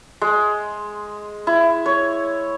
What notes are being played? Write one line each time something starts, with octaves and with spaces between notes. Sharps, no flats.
G#3
E4
C#5